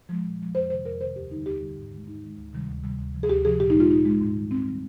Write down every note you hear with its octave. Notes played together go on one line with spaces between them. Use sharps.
F3 G#3
A#2
F3 G#3
F2 C5
C3 D#3 C5
F2 A#4
C3 D#3 C5
D#2 G4
D3 G3 D#4
D#2 G4
D3 G3
G#2
D#3 G#3
G#2 D#4
D#3 G#3
D2
C3 D#3 G3
D2
C3 D#3 G3
D2
C3 F3
G#4
D2 G4
C3 F3 G#4
A#2 G4
D#4
G#3 F4
A#2 D#4
G#3
G#2
D#3 G3
G#2 C4
D#3 G3